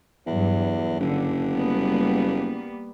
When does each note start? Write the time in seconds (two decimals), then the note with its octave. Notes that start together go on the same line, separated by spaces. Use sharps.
0.27 E2 G2 F#3
1.00 F#1 D3
1.50 G3 A#3 B3